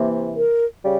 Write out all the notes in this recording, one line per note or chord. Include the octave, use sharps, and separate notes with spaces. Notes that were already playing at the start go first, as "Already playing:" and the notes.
Already playing: C3 E3 A#3
A#4
C#3 G3